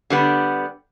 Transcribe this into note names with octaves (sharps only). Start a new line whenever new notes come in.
D3 G3 B3